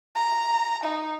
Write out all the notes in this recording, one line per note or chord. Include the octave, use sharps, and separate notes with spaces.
A#5
D#4